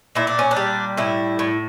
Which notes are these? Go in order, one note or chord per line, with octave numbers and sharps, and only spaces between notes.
A#2 E4
D4
C#4
D4
G3
A2 E4
A2